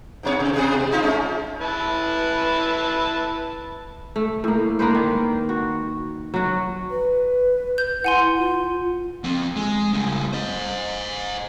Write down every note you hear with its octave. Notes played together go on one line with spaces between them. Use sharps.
G#2 B2 C#5
C3
B2 G#4
G#3
G#3 D#4 F4
G#3 C#4
E4 B4 A5
A3
A2 A#3
A#3 D4 B4 C5
D#3
F#4
F#3 F#4
B4
G6
E4 F#5 G#5 C6
F4
F2 C4
G#3
C#3 G3
C5 D#5